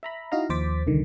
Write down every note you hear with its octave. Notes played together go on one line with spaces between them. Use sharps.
E5 A#5 B5
D#4 E4 F#4 D#5 F5 A#5
D#2 F3 C5 D6 A6 B6
C2 D3 D#3